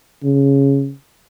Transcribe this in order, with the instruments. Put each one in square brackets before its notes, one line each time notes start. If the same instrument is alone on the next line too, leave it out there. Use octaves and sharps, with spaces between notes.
[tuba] C#3